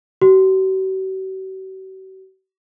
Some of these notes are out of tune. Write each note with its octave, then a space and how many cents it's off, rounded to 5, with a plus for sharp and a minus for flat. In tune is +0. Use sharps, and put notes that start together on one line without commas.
F#4 +45